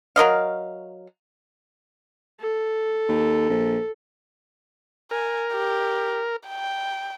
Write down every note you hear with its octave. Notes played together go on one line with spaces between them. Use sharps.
F#3 A#4 D#5 F5
A4
D#2
A#1
A#4 G#5
G4
G5